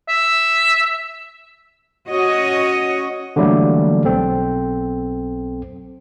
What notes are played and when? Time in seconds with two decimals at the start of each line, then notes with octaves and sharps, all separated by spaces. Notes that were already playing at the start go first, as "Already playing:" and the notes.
0.09 E5
2.07 C#4 F#4 C#5 D#5
3.36 D3 E3 F#3 G3 A3 A#3
4.05 B1 C4 A4